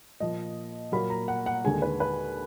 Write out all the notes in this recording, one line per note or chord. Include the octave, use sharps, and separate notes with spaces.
A#2 F3 A#3 D#5
A#2 F#3 A#3 B5
A#5
F#5
F#5
D#2 D3 G#3 G#5
B4
B4